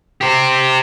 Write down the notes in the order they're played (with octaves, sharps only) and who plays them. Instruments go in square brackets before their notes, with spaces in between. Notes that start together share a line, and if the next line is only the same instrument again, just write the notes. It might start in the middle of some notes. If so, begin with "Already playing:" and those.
[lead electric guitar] G4 C5